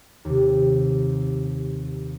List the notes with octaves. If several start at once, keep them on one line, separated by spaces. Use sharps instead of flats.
D#2 C3